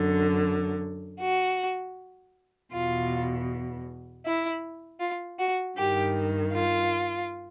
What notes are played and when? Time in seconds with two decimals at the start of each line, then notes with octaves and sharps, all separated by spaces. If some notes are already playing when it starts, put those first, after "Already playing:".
Already playing: F#2 D3
1.20 F#4
2.72 E2 B2 F4
4.25 E4
5.00 F4
5.39 F#4
5.77 G2 D#3 G4
6.53 F4